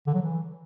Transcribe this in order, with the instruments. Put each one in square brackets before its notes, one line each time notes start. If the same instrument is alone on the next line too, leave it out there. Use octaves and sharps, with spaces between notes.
[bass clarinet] D3
F#3
E3